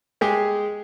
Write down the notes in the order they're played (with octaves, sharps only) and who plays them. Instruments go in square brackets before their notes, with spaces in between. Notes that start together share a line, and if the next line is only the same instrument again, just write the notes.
[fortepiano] G#3 G4 G#4